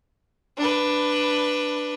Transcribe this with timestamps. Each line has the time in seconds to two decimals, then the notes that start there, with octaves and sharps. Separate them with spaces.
0.57 D4 B4